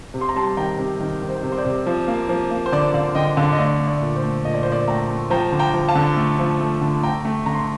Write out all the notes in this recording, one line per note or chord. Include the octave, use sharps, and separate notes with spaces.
C3
C6
A#5
G3 A5 C6
D#3 G5 A#5
C3
D#3
D#3
C5
C3
C5
D5
C3
F3
A#3
F3
A#3
C5
D3 D5
D3 D5 F5
D3 D#5 G5
D3 F5 A5
D#5
A3 D5 F5
A3
D5
A#2
C5
A3
A#2 D#5
D5
A#2 C5
D5
A3 G5 A#5
A3
F3 G5 A#5
D3
G5 A#5
F3
F5 A5
D3
A3
F3
A3
D3
A3 G5 A#5
A3
D3 A#5
C6